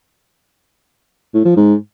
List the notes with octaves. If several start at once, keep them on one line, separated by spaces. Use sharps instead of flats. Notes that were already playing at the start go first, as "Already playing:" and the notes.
A2
F3
G#2